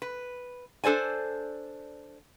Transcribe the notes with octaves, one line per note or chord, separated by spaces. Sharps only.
B4
D4 A4 C5 D5 G#5